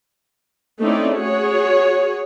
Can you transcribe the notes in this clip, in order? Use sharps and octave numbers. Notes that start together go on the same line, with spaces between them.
A3 C4 C#4 D#4 E4 D5
F#4 G#4 C#5